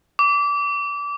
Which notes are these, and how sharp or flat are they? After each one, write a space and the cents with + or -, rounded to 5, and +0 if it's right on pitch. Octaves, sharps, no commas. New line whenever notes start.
D6 -25